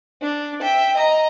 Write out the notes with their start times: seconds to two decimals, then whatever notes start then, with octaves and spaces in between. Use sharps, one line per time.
0.22 D4
0.61 E5 G5
0.97 D#5 A#5